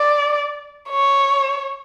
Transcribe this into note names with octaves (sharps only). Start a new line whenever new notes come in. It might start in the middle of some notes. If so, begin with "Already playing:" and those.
Already playing: D5
C#5